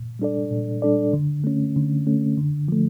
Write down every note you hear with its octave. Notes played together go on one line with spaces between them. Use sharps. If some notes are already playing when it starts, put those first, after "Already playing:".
Already playing: A#2
G3 D4 A4 D5
A#2
G3 D4 A4 D5
D3
A3 C#4
D3
A3 C#4
D3
F3 A3